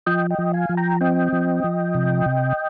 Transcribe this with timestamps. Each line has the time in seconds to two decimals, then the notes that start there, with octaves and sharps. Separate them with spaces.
0.07 F3 D#5 G5
0.30 D#5 G5
0.39 F3
0.53 F5 G#5
0.69 F3
0.77 G5 A#5
1.01 C4 D#5 G5
1.33 F3
1.64 F3
1.95 C3
2.26 C3